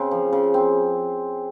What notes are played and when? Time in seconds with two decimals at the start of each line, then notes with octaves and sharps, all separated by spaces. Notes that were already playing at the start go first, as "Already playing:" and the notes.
Already playing: C#3 C4
0.11 F3
0.33 C#3
0.54 C4